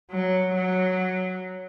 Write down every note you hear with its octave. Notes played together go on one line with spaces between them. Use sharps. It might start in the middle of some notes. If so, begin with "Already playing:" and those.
F#3
F#3